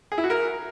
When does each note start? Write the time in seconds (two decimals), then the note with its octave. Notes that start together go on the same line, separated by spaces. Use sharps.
0.12 G#4
0.18 E4
0.24 F#4
0.30 A#4